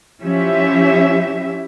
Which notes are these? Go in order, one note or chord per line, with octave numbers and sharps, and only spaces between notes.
F3 C#4 E4 G4 E5